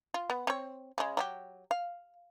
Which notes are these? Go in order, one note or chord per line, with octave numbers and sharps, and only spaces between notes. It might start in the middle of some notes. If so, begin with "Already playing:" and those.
F4
B3
C4 C#5
C#3 G#3
F#3 D4 G4
F5